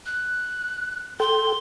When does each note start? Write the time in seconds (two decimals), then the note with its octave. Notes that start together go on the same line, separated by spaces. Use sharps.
0.06 F#6
1.20 A4 G5 C6